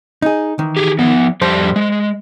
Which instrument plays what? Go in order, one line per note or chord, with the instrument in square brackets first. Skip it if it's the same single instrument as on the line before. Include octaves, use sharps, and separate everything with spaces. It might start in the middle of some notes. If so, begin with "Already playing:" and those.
[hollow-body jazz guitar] D#4 G#4
D#3 E3
[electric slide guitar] G4 G#4
F3 B3
[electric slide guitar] F2 G3 A5 [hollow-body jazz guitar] C5
[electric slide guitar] G#3